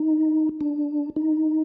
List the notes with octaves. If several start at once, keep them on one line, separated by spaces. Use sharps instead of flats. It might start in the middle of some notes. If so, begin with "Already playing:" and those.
Already playing: D#4
D4
D#4